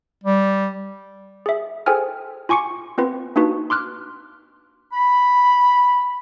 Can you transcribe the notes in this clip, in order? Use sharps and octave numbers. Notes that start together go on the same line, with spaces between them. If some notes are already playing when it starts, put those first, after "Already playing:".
G3
G#4 E5
G#4 A4 C5 G5 G#5 F6
F4 G#5 C#6 D6 C#7
B3 C4 F4 B4
A#3 D4 D#4 F#4 B4
C6 D6 F6 F#6
B5